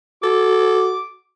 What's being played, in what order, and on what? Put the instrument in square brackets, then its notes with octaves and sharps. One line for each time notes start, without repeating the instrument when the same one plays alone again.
[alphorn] F#4 [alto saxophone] A4 [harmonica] D6